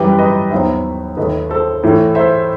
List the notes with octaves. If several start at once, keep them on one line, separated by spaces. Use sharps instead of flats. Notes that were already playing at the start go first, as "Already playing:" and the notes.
Already playing: F#2 E3 G3 G4 B4
B4 D#5
D#2 D#3 F#3 B3 C5 E5
D#2 D#3 A3 B4 D#5
A4 C5
A2 E3 A3
C5 E5